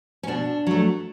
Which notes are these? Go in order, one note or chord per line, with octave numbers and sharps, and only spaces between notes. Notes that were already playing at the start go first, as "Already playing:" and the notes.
C#4
B2 D4
F#3 A3